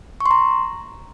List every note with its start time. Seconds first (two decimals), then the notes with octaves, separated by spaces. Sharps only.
0.20 C#6
0.26 C6
0.31 A#5